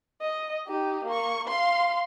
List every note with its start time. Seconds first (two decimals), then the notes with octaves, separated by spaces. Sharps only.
0.21 D#5
0.67 D#4 G4
1.05 A#3 C#6
1.48 F5 C6